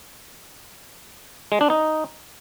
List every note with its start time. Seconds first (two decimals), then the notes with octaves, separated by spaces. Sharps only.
1.52 G#3
1.61 D4
1.70 D#4